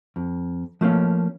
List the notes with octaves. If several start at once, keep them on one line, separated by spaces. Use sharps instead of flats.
F2
F3 A3 A#3 C#4